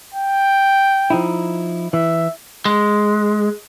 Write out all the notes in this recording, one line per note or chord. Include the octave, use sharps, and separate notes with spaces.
G5
F3 D#4 E4
E3 E5
G#3